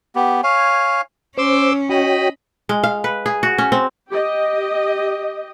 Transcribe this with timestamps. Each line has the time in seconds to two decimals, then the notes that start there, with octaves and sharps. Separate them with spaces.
0.15 B3 G4
0.43 C#5 F5 G#5
1.38 C#4 C5 C6 D6 E6
1.89 F#4 C#5 D#5 G5 B5
2.69 G#3
2.84 F5
3.04 B4
3.26 G#4
3.43 F#4
3.58 C#4
3.72 C4
4.10 G4 D#5